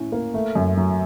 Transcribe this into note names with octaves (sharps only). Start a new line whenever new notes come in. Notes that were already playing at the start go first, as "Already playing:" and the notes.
Already playing: A2 C#4
A#3
A3
F#2
F#3